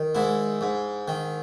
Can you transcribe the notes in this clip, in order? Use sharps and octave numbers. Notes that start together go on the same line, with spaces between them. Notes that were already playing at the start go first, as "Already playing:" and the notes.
Already playing: D#3
G#2 E4
G#2
D#3